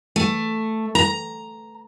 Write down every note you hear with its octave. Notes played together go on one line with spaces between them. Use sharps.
A3
A#5